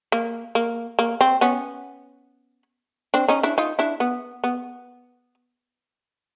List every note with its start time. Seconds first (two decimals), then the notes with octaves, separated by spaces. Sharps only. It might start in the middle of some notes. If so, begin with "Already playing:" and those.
0.12 A#3
0.55 A#3
0.99 A#3
1.21 C4
1.41 B3 C#4
3.14 C4 D4
3.28 C#4 D#4
3.43 D4 E4
3.58 D#4 F4
3.79 D4 E4
4.00 B3
4.44 B3